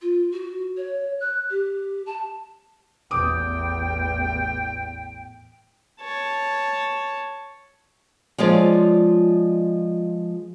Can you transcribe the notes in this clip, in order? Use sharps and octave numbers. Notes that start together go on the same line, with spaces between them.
F4
F#4
C#5
F#6
G4
A5
A1 E2 G5 D6 D#6
C#5 A5
F3 G#3 F4 G#4 C#5 D5